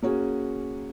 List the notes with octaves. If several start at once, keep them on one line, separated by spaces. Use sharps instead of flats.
A#3 C#4 F#4 G#4